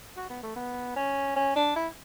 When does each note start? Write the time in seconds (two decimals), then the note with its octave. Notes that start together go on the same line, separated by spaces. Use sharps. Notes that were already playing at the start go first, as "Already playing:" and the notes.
0.16 F#4
0.29 B3
0.43 A3
0.56 B3
0.96 C#4
1.36 C#4
1.56 D4
1.76 E4